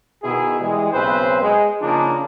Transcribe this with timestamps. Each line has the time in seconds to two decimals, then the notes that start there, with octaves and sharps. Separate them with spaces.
0.23 B2 D#3 E4 G#4
0.60 E3 G3 G#3
0.92 B1 C#3 C4 B4 C5
1.41 G#3
1.80 C#3 F3 A#3 D4 D#4